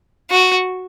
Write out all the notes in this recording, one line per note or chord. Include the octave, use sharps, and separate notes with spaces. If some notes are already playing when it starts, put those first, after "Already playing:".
F#4